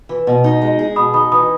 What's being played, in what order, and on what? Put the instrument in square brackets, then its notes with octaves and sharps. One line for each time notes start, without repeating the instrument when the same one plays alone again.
[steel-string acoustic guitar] E3
B2
D#4
G#3
G#4
[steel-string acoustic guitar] B2 [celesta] B5 D#6
[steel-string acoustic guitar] D#4 [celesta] B5 D#6
[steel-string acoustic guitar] E3 [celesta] B5 D#6